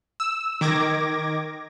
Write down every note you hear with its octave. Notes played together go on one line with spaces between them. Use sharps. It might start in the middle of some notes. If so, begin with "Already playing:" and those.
E6
D#3 D6 G#6 A#6